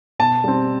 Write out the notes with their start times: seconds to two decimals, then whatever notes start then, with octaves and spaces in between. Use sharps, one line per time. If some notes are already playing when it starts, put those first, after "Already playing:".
0.19 B2 A5
0.44 G3 C4